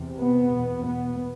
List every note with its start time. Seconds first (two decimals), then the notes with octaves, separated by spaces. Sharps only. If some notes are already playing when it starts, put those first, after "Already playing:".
Already playing: E2 C3
0.20 B3
0.52 E2 B2
0.85 B3